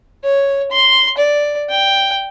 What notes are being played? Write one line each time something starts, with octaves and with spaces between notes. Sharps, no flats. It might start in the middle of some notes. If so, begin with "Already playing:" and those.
C#5
C6
D5
G5